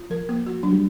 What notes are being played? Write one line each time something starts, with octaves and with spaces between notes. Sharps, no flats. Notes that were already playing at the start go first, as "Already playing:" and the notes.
Already playing: F4
F3 A#4
A#3
F#4
F#3 D4
G3